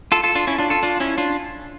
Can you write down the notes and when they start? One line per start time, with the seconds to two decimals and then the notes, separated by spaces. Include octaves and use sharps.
0.12 F4 A4
0.24 F4 A4
0.35 D4 F4
0.47 C#4 E4
0.58 D4 F4
0.70 F4 A4
0.83 D4 F4
1.00 C#4 E4
1.18 D4 F4